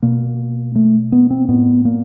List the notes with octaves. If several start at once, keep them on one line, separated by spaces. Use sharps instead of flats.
B2 A#3
A3
B3
C4
A2 B3
A#3